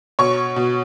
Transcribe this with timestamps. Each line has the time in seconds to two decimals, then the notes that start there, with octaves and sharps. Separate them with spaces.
0.19 B2 C#5 C#6
0.56 B2